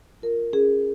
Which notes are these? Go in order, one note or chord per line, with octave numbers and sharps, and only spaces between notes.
F4 A#4
C#4 G#4